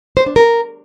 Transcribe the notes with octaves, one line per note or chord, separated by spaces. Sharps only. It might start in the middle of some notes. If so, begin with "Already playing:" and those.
C5
D4
A#4